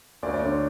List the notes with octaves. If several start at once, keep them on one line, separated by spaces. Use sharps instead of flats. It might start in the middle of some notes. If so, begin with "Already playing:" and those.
D2 D5
D5
D3 C#5